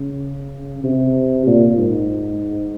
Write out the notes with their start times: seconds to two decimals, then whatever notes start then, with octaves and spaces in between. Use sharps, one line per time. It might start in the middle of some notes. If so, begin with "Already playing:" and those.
Already playing: C#3
0.84 C3
1.47 A#2
1.77 G#2